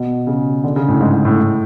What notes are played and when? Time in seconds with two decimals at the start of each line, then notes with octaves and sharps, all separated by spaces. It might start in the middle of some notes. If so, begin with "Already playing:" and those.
Already playing: B2
0.27 C#3
0.64 D3
0.76 C#3
0.88 A2
1.00 G#2
1.13 G#2
1.25 A2